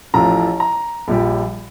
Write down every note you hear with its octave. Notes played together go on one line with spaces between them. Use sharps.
A1 A2 F3 A#5
A#5
A#1 A#2 G3